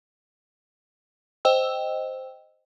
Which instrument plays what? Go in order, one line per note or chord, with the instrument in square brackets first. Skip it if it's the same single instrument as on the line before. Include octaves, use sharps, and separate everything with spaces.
[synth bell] C5 D#5 G5 E6